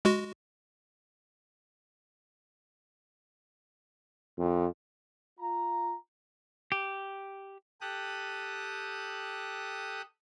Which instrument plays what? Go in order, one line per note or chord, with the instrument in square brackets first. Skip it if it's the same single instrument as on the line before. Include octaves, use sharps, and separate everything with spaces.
[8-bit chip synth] G#3 F#4
[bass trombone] F2
[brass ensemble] F4 A#5
[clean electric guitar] G4
[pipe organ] G4 A4 D#6 F#6